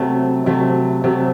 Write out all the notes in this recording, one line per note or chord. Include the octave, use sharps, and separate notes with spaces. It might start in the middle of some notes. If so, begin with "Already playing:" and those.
Already playing: C3 F#3 A3
C3 F#3 A3
C3 F#3 A3